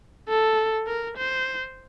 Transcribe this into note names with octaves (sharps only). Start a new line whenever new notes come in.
A4
A#4
C5